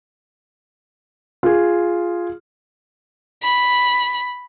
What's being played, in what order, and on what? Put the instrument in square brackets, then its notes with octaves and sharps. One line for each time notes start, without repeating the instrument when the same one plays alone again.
[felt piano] F4 G#4
[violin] B5